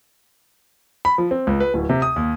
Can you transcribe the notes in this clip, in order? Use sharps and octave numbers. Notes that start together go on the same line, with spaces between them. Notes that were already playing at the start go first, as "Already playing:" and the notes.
B5
F3
C4
C#2
B4
D1
C3
D#6
D#2